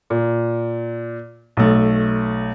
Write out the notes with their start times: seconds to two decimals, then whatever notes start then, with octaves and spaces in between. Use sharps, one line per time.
0.10 A#2
1.57 B1 A3